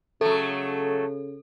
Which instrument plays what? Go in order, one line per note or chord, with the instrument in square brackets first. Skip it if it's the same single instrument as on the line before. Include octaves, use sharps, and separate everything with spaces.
[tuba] C#3 [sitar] F#3 A3 [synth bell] A4